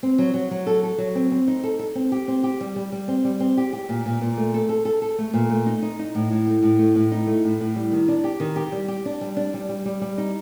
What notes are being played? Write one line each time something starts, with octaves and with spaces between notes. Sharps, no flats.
C4
F#3
F#3
F#3
A4
A4
F#3
C4
C4
D#4
A4
A4
C4
G4
C4
G4
G3
G3
G3
C4
G3
C4
G4
G4
A#2
A#2
A#2
A3
A4
A4
A4
A4
A3
A#2
A3
D#4
D#4
D#4
A2
A2
A3
A2
A3
A2
D#4
A3
A2
A2
G3
D#3
D4
G4
D#3
G4
G3
G4
D4
G3
D4
G3
G3
G3
G3
D#4